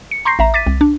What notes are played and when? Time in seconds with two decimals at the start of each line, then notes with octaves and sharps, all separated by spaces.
0.11 C#7
0.25 A#5 C6 C#6 G6 A#6 C7
0.39 A1 E5 A#5
0.54 D6 A6 B6 D#7
0.67 C2
0.81 D4